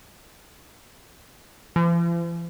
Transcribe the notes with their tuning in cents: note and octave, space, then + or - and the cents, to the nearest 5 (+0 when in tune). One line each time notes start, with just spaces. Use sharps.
F3 -45